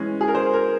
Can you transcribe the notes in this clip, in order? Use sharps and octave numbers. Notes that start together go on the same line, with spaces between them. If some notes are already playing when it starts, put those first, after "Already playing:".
Already playing: E3 G#3 C#4
G#4
A#4
C5
A#4